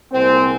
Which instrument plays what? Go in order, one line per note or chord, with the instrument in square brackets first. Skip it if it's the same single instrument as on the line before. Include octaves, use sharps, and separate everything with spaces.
[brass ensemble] C2 A#2 G#3 C4